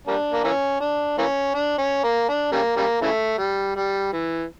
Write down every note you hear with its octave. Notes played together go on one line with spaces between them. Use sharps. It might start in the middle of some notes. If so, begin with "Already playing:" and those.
G3 A#3 D4
A#3
E3 A#3 C#4
D4
E3 A#3 C#4
D4
C#4
A#3
D4
C#3 G3 A#3
C#3 G3 A#3
C#3 E3 A3
G3
G3
E3